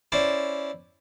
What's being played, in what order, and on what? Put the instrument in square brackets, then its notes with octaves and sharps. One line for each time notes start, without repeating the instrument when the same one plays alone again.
[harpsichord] C#4 E4 C5 D5